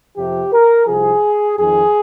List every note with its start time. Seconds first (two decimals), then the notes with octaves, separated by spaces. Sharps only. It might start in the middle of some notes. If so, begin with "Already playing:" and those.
0.16 F2 C3 F3 G4
0.52 A#4
0.87 C2 C3 F3 G#4
1.58 F2 D#3 G#4